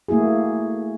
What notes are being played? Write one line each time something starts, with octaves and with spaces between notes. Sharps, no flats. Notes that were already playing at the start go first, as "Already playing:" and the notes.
A3 A#3 E4 F#4 G#4